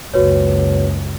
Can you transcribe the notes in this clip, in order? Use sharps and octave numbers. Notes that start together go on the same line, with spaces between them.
F#1 C#2 F#4 B4 C#5